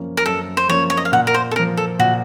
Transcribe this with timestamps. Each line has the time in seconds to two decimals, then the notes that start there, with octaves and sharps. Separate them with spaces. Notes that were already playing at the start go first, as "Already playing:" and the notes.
Already playing: F#2 F3 A#3 C#4
0.17 A#4
0.26 F#2 A4
0.57 C5
0.69 F3 A#3 C#4 C#5
0.90 C#5
0.97 D#5
1.05 F5
1.12 A#2 F#5
1.27 A#4
1.34 C5
1.51 A4
1.56 F3 A#3 A#4
1.77 A4
1.99 A#2 F#4